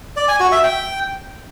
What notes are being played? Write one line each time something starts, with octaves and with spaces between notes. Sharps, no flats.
D5
G#5
F#4
E5
G5